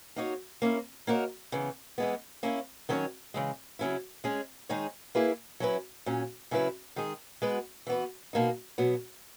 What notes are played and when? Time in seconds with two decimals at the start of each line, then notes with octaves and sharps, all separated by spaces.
0.16 A#3 D#4 F#4 C#5
0.62 A#3 C#4 E4
1.07 A#3 D#4 F#4 A#4 C#5
1.52 C#3 E3 B3
1.98 E3 G#3 B3
2.43 A#3 C#4 E4
2.89 D#3 F#3 C#4 G#4 C#5
3.34 C#3 E3 G#3
3.79 C#3 F#3 C#4 E4
4.24 G#3 C#4 G#4
4.69 D#3 G#3 D#4 G#4 C#5
5.15 A#3 E4 G#4 B4
5.60 F#3 C#4 E4 B4
6.06 A#2 F#3 C#4
6.51 C#3 F#3 C#4 E4 B4
6.96 D#3 G#3 D#4 G#4
7.42 G#3 B3 F#4 B4
7.87 E3 B3 F#4 B4
8.33 B2 A#3 D#4
8.78 B2 F#3 B3